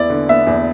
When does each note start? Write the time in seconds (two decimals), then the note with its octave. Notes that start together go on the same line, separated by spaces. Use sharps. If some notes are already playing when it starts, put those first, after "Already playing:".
Already playing: E2 B3 E4 D5
0.10 D3
0.29 B3 E5
0.47 E2